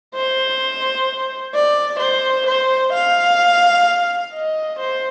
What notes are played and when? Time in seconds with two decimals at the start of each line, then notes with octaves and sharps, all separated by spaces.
0.15 C5
1.54 D5
2.00 C5
2.47 C5
2.94 F5
4.34 D#5
4.80 C5